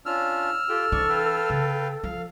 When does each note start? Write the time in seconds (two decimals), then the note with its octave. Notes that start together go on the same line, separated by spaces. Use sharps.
0.06 C#4 D4 F4 E6 F6
0.69 F4 G4 A4 G5
0.92 G#2 E3 D4 D5 C#6
1.09 B4 F5 G5
1.50 C#3
2.03 F3 F5